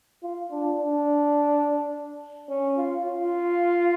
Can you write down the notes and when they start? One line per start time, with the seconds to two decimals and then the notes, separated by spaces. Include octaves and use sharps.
0.23 F4
0.51 D4
0.80 D4
2.49 C#4
2.77 F4
3.05 F4